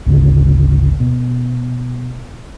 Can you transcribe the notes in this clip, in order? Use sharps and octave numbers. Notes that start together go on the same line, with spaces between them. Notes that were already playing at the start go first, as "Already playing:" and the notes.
G#1 D2 C#3
B2